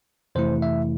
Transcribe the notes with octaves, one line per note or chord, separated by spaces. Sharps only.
F2 C3 E3 A3 E4 C5
E5